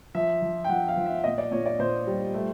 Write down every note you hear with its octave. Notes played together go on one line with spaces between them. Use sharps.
F3 E5
F3
G5
F3 F#5
F5
F3
E5
A#2 D#5
D5
A#2 C#5
D5
A#2 C5
G3
A3